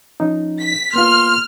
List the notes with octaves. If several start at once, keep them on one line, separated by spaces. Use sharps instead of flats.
F3 C#4 D#4
B6
A#3 B3 F4 C6 F6